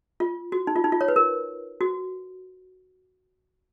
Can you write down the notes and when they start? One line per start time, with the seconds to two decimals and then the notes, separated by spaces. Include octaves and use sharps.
0.20 F4
0.52 F#4
0.67 D#4
0.76 F4
0.84 D#4
0.92 F4
1.01 C#5
1.08 B4
1.16 A#4
1.81 F#4